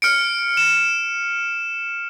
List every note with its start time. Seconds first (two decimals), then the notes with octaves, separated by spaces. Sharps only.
0.02 F6 C#7 D7
0.57 E7